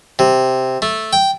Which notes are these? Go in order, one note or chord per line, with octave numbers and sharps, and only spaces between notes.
C3
A3
G5